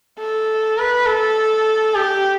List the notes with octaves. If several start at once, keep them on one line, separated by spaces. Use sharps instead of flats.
A4
B4
A4
G4